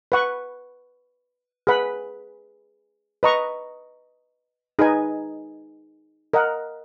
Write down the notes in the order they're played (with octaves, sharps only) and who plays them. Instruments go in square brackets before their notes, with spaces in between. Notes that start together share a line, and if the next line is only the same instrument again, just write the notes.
[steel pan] B4 F#5 C#6
G#4 B4 F#5 B5
B4 D#5 A#5 C#6
D#4 G#4 B4 D#5 G#5
A#4 D#5 F#5